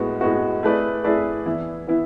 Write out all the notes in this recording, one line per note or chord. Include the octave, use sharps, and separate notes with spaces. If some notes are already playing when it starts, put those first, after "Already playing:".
Already playing: A2 G#3 B3 F#4
A2 G#3 B3 F#4
A3 E4 G#4 B4 D5
A3 E4 G#4 B4 D5
E3 B3 E4
E3 B3 E4